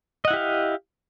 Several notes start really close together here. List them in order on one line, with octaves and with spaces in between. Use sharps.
D#5 F#5 E4 G4 F5